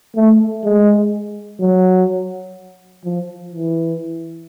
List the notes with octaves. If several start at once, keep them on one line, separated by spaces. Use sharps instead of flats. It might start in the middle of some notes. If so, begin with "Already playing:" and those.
A3
G#3
F#3
F3
E3